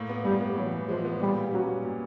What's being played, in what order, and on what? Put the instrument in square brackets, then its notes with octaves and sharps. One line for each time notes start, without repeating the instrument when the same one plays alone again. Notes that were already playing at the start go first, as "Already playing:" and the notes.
Already playing: [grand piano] A2 A#3
B3
[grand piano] A2 [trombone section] G3
[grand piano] B3
[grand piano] E3 [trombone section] F#3
[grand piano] E3
[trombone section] F3 [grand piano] G#3
[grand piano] B3
[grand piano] A#2 [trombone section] G3
[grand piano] G3
[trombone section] F#3 [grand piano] C#4
[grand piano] A#2
A#2